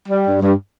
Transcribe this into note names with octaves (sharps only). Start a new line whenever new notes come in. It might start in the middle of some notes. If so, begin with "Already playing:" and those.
G3
G2
G2